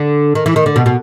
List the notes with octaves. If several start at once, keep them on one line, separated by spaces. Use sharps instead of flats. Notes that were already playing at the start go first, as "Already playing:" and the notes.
Already playing: D3
D#3
E3
D#3
D3
B2
B2